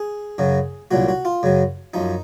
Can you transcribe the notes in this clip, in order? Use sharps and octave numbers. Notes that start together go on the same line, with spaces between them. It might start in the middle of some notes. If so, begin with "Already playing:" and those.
Already playing: G#4
F#2 C#3 F#3
C2 A#2 F#3 F#4
F#4
F4
F#2 C#3 F#3
F#2 F3 D#4